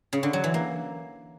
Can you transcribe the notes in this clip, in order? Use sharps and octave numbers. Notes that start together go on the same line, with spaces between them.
C#3
D3
F#3
E3
A#3